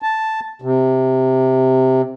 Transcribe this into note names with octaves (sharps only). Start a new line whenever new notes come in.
A5
C3